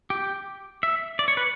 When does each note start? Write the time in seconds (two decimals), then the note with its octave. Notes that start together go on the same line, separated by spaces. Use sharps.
0.10 G4
0.83 E5
1.19 D5
1.28 C#5
1.37 B4